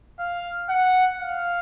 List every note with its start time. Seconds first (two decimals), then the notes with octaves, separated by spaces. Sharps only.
0.20 F5
0.69 F#5
1.21 F5